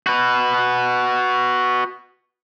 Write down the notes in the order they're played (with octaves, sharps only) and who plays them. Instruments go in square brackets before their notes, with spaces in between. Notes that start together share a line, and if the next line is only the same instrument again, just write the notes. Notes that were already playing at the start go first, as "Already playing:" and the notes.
[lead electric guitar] F#4 B4